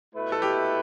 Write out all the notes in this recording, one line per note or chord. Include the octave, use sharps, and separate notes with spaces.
B2 A3 E4 B4
A4
G4